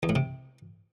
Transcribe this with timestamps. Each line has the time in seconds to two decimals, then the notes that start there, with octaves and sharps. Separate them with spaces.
0.03 E2
0.09 A2
0.16 C3